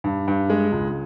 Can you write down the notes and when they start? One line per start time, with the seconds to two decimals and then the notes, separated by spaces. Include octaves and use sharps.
0.04 G2
0.28 G2
0.50 G#3
0.72 C#2